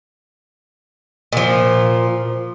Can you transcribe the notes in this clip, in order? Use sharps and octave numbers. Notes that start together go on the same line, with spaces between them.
A#2 F3